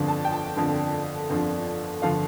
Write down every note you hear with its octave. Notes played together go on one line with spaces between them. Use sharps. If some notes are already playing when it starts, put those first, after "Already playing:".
Already playing: G1 F2 D3 F3
A5
G5
A5
G1 F2 D3 F3
G1 F2 D3 F3
G1 D3 F3 F5